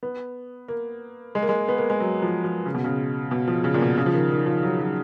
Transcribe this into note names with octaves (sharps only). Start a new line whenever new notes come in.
B3
A#3
G#3
A#3
G#3
B3
A#3
G#3
F#3
F3
F3
C#3
B2
C#3
B2
F3
C#3
A#2
B2
C#3
F3
D#3
D#3
F3
F#3
F#3